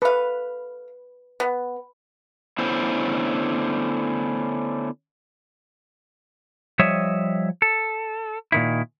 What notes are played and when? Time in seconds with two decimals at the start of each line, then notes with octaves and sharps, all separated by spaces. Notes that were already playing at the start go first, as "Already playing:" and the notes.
0.02 A4 B4 F5
1.40 B3
2.58 D3 A3 B3 C#4 E4 C5
6.79 F3 G3 C#5 D#5 E5
7.62 A4
8.52 A#2 D#3 E4